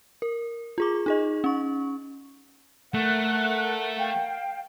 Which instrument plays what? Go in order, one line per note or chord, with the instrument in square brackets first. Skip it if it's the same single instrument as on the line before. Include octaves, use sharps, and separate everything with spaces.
[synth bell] A#4
F4 G#4 D6
D#4 G#4 D#5
C#4 C#6
[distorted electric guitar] A3 [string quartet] A#4 F#5 [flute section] F#6
[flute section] F5 G5